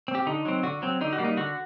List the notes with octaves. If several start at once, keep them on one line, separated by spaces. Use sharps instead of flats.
C4
G4
D3 D#4
F#3 C4
D3 F#4
F#3 C4
D3 D#4
F#4
G3 A#3
D#4
D3 F#4